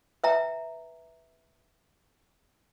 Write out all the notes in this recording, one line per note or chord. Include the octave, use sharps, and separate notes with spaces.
B4 E5 G5 A#5